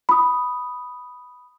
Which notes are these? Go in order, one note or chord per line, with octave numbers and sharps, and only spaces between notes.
B5 D#6